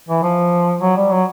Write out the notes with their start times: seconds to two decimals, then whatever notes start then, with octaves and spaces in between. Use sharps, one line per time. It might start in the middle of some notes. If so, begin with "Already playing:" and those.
0.09 E3
0.22 F3
0.81 F#3
0.96 G3
1.11 F#3